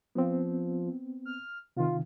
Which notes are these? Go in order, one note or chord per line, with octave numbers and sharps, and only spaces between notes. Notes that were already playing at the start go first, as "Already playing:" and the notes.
F3 B3 C4
F6
C3 D#3 F4